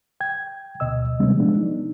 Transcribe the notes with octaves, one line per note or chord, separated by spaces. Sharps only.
G5 G#6
D2 B2 D#5 E6
C3 D#3 G3 G#3 B3 C#4
F3 G#3 B3 D4
D#4